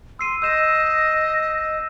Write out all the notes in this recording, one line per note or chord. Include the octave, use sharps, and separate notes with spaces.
C6 E6 C7 D#7
D#5 E6 G6 E7